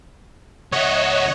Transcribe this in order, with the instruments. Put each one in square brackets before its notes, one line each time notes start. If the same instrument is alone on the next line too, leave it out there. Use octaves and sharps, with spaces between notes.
[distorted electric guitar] C#2 E5 [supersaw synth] C#5 D#5 F#5